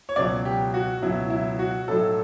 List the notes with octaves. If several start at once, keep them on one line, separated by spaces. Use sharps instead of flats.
C#5
C#2 B2 F#3 D5
G4
F#4
C#2 B2 F#3 E4
E4
F#4
B1 A2 F#3 A4